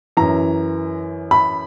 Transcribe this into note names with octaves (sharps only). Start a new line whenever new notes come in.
F#2 E3 A#5
B5